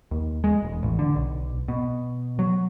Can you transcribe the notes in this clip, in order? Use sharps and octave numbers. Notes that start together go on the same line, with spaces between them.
D#2
G#3
E1
A1
D3
B1
B2
F#3